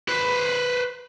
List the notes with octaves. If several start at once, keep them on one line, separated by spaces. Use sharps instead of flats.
B4 C5